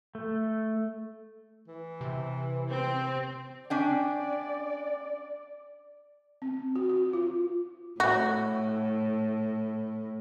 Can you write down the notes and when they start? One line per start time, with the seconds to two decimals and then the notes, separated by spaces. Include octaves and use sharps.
0.15 A3
1.68 E3
2.01 C3
2.68 C4
3.70 C#4 D4 D5 G5
6.42 C4
6.76 F#4
6.90 F#4
7.13 F4
8.00 A2 F#4